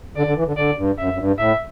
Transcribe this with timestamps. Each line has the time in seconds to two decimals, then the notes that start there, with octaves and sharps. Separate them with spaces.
0.16 D3 D5
0.27 D3
0.37 E3
0.47 D3
0.57 D3 D5
0.77 G2
0.98 F#2 E5
1.13 F#2
1.18 G2
1.38 A2 E5